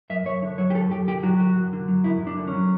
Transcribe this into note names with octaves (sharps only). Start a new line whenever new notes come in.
F#2 E5
F#2 C#5
D3
F#3 C#5
G4
F#2 A4
F#2 G4
D3 G4
F#3 F#4
F#2 F#4
F#2
D3
F#3
F#2 E4
F#2
D4
D3
C#4
F#3